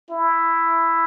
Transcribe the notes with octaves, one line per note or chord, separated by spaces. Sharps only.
E4